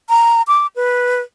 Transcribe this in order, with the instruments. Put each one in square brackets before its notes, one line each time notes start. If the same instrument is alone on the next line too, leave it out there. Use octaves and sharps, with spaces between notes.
[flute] A#5
D6
B4